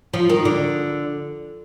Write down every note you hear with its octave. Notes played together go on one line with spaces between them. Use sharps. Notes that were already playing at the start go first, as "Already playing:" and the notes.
F3
D#3
D3